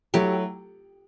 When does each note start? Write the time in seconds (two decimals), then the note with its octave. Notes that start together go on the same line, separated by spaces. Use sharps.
0.14 F#3 A3 E4 G4